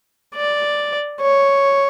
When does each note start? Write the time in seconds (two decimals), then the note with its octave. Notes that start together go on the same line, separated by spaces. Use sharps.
0.35 D5
1.21 C#5